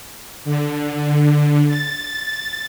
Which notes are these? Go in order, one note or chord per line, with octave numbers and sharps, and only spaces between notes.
D3
A6